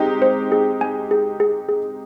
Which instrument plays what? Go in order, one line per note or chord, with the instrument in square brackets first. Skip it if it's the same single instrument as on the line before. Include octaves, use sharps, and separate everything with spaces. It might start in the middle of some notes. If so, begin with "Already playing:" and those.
Already playing: [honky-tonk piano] G#3 C4 D#4 G4 [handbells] D#5
[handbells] C5
G#4
G#5
G#4
G#4
G#4